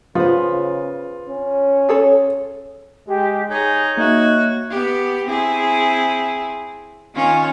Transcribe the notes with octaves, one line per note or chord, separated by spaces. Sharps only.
C#3 B3 F4 C5
C#4
G#4 A4 C#5
G#3 G4
D#4 G#4 C#5
A#3 D#4 F#4 D#5 E5
B3 G4
C4 E4 G#4
D#3 C#4 F4